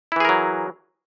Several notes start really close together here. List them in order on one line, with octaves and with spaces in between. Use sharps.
E4 E3 G#4 A#4 F#3